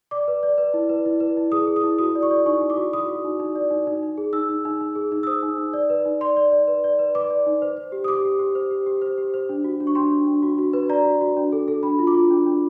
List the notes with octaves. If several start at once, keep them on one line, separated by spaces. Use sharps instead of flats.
D5 D6
B4
D5
B4
E4
B4
E4
B4
E4
G#4 D#6
G#4
D#6
E4
F#4 D#6
D5
C#6
D5
D#4 C#6
D#4
D6
F#4
F#4 D#6
F#4
D#4
D#4
D5
D#4
D#4
D#4
G#4
D#4 E6
D#4
D#4
D#4
G#4
D#4
E6
C5 D#6
D#4
D#4
D5
B4
D#4
D5 C6
D5
D5
B4
D5
B4
B4 D6
D5
D#4
C5
C5
G4
D#6
G4 D6
G4
G4
C5
G4
G4
C5
G4
C5
D4
F#4
D4
C#6
D4 C6
D4
D4
F#4
F#4
B4
D5 A#5
F#4
F#4
D4
A4
A4
D4 B5
F4
D6
F4
D4
D4